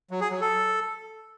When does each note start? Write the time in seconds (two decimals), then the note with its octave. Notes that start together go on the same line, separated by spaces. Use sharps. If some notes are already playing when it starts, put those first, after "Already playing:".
0.11 F#3
0.21 G#4
0.31 F#3
0.41 A4